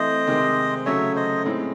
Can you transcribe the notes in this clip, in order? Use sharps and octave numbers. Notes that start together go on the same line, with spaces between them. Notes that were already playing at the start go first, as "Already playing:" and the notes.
Already playing: E3 A3 C4 E4 C5 D#5
C3 D#3 G#3 C4
C#3 F#3 A3 C#4 C#5 E5
C5 D#5
A2 G#3 C4 D#4